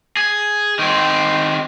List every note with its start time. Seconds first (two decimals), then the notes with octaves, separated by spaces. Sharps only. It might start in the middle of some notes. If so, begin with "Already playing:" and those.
0.17 G#4
0.79 D#3 C4